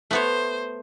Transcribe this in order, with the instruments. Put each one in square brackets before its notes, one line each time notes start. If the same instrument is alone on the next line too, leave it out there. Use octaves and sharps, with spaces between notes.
[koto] A3 B3 C#5 [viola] C5